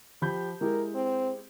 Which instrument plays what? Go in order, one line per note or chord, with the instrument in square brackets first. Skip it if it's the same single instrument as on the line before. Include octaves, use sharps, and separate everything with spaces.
[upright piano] F3 B5 G6 [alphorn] G4
[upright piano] G#3 E4 G4 [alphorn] A#4
[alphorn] C4